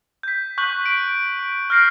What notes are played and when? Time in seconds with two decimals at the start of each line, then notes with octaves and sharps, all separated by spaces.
0.23 G6 B6
0.58 C#6 F#6 G6 B6 F#7
0.86 D7
1.70 F6 G6 A#6 C7 D7